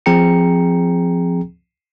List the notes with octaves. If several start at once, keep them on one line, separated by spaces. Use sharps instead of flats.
F3 C4 G#4 G5 A#5 C#7